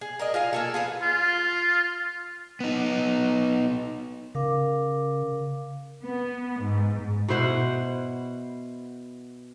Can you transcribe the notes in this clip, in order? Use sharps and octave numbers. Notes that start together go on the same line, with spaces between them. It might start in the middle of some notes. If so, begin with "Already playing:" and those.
G#4
A#4 D5 D#5
F4 G#4 F5
A#3 G#4 A4
F4 G#4 B4
F4
B3 D#4
C#3 A#4 F5 D6
B3
G#2
B2 E4 C5 F#5